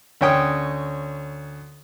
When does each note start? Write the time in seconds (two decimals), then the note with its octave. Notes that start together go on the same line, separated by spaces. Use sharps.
0.21 D2 C#4 C#5 G5 D#6